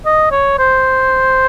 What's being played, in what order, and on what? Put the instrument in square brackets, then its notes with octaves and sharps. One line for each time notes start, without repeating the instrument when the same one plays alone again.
[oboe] D#5
C#5
C5